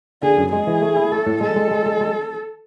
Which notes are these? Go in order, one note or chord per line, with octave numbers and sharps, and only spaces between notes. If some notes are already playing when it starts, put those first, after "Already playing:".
D3 G#4
F#2
G#3 G#4
E3
A3
E4
A3 A4
A2
G#3 A4
G#3
G#3
G#3
G#3